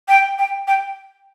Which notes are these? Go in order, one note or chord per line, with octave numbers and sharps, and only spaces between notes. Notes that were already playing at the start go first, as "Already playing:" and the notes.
G5
G5
G5